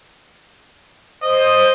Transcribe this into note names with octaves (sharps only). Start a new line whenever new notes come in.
C5 D#5